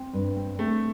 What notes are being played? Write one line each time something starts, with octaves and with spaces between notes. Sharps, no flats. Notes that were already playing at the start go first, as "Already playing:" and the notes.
Already playing: C4
G2
C4
A3 C4